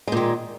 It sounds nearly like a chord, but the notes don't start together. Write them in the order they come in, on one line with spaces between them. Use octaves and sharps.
G#3 A#2 D#3